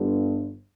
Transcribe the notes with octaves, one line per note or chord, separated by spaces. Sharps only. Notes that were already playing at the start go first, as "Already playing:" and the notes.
Already playing: G1 G2 D3